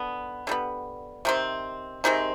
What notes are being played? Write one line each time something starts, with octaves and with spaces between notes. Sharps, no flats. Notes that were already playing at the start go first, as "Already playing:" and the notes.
Already playing: D3 B3
D3 G3 B3
C3 D#3 C4
C3 D#3 G#3 C4